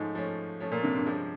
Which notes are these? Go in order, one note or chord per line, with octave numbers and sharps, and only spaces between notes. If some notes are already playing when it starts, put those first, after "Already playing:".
Already playing: G#2 F3 A3 C#4
F3 A3 C#4
F3 A3 C#4
A#2
C3
G2
C3 F3 G#3 C#4